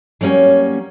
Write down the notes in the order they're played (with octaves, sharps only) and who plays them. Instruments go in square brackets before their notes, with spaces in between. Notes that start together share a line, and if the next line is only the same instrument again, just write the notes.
[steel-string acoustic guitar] F#3 G3 A#3 C4 C#4